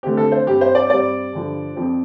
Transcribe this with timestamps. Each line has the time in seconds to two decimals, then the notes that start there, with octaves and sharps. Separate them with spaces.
0.03 D3 A3 C4 G4
0.17 A4
0.32 C5
0.47 G2 G3 C4 G4
0.61 C5
0.75 D5
0.90 G2 G3 C4 D5
1.33 G2 D3 F3
1.76 F2 F3 C4